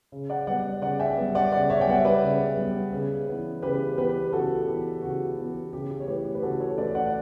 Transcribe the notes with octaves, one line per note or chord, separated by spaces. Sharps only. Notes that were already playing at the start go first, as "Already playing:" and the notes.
C#3
D5 F#5
G3 B3 D5 F#5
C#3 D5 F#5
E5 G5
G3 B3
D5 F#5
C#3 D5 F#5
C#5 E5
G5
G3 B3 F#5
E5
B4 D5
C#3
G3 B3
C#3
E3 B3
C#3 G4 B4
E3 B3 G4 B4
C#3 F#4 A4
E3 B3 G4
C#3 F#4
E3 B3 G4
C#3 G4
G4
C#5
E3 A3 E4 G4 B4
G4
B4
C#3 F#4 A4
A4 C#5
E3 A3 E4 B4 D5
D5 F#5
F#5